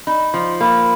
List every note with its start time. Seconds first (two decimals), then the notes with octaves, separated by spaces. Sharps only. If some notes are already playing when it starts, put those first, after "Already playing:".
0.07 D#4 B5
0.34 F3 C6
0.61 A#3 B5